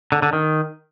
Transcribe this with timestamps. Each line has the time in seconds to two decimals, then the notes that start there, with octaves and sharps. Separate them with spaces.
0.12 D3
0.22 D3
0.33 D#3